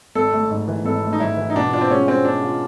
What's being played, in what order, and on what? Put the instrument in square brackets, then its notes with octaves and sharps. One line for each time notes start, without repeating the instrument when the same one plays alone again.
[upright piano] G#1 [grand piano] A4
[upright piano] A3
G#2
E3
[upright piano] G#1 [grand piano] A4
[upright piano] A3
[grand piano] D#4
[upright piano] G#2 [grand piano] E4
[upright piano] E3
[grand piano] D#4
[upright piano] B2 [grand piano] D4
[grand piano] D4 [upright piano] F4
[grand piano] C4
[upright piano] G#3 [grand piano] C#4
[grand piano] C4 [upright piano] C#4
[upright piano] B2 [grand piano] D4
[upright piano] F4